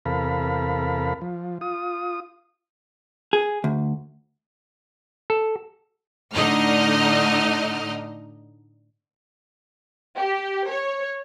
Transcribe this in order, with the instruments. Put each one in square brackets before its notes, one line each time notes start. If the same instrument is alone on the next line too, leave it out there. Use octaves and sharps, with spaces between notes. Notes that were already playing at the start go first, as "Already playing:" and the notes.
[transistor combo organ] E2 C3 A4 A#4 F5 B5
F3
F4 D#6
[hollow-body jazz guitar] G#4
D2
[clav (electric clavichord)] A4
[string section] A2 D3 D#4 D#5 F6
[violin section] G4
C#5